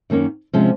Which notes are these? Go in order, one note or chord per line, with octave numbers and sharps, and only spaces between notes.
F#2 D#3 A#3 C#4
C3 F3 G#3 C#4